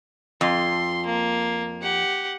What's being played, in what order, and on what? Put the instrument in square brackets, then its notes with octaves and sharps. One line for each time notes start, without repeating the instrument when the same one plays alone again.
[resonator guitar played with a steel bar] F2 [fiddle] C6
[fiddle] A#3
G4 F#5